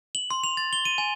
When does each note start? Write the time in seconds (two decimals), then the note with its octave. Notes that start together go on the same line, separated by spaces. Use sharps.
0.15 F#7
0.31 C6
0.44 F7
0.57 A6
0.73 G7
0.85 D#7
0.98 G#5